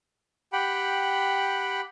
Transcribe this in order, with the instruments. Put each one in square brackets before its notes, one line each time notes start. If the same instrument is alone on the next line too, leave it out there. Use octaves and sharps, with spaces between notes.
[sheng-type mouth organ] G4 F#5 G5 B5